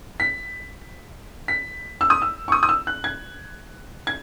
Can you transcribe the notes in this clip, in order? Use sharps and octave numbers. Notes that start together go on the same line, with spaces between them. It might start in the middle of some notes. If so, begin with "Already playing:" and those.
B6
B6
E6
D#6
E6
C#6
D#6
D#6
E6
F#6
G#6
G#6